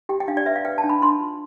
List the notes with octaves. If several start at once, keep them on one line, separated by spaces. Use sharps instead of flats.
G4 G5
G5
D4 F5
D5
B4 E5
F5
B4 G5
A5
D4
B5
D4 C6
F4